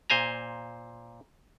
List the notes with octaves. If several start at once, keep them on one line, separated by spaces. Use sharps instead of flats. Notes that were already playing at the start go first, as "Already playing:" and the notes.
A#2 C5 G#5 A#5